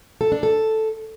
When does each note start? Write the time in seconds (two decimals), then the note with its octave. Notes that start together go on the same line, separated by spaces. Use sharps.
0.21 A4
0.32 D4
0.43 A4